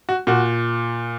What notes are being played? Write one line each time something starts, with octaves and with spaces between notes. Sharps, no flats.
F#4
A#2 F#4